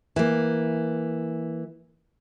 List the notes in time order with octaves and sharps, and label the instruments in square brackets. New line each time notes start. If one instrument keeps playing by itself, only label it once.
[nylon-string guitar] E3 A#3